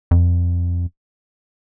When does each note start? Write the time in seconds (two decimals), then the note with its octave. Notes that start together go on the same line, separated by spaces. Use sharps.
0.11 F2